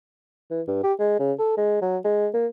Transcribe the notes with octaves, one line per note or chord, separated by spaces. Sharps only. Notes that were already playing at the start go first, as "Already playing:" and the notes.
E3
G2
G4
G#3
C#3
A4
G#3
F#3
G#3
A#3